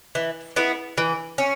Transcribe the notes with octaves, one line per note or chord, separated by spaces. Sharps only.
E3
B3 E4 G#4
E3
C#4